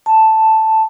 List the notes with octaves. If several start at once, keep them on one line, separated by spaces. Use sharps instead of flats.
A5